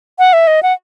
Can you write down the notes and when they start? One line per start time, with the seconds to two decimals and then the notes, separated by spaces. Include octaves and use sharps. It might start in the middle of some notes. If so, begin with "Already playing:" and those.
0.19 F#5
0.33 E5
0.47 D#5
0.63 F#5